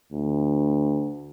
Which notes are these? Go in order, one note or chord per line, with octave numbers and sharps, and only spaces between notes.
D2